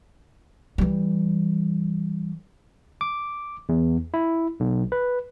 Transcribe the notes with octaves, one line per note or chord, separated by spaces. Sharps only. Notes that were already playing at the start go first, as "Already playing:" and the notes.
E3 G3
D6
E2
E4
B1
B4